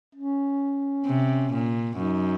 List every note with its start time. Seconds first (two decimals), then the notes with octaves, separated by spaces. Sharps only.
0.15 C#4
1.06 C3
1.52 A#2
1.97 F#2 D#4